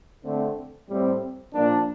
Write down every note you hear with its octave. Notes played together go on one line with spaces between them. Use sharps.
D3 A3 C4
A2 G3 C4
A#2 F3 A#3 D4